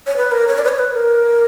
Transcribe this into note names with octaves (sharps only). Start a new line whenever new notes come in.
C#5
B4
A#4
C#5
D5
B4
C#5
B4
A#4